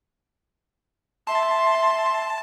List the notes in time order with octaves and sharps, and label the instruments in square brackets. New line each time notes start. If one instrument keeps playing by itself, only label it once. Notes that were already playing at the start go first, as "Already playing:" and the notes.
[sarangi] E5 [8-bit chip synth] A5 [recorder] C6